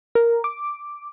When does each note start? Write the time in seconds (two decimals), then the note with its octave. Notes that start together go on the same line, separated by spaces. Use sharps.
0.15 A#4
0.44 D6